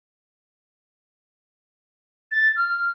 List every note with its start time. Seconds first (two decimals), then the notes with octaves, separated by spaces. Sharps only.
2.32 A6
2.56 F6